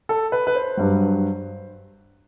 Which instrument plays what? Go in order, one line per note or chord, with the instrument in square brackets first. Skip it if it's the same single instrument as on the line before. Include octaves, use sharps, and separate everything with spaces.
[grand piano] A4
B4
B4
C5
G2 F#3